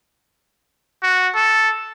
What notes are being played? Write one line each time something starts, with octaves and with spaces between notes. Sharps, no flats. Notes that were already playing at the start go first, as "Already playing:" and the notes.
F#4
A4